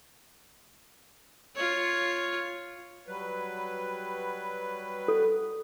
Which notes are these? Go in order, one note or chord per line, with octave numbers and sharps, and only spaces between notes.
F4 C#5
F#3 G3 B4
A4